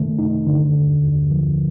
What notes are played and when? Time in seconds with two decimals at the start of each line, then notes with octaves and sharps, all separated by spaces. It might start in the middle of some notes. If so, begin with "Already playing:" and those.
Already playing: C3 D#3 A3
0.19 D#4
0.47 D3
0.75 D#2
1.03 D#2
1.31 F3